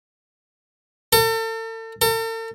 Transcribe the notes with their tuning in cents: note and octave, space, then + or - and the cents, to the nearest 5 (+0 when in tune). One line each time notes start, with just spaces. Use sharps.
A4 +40
A4 +45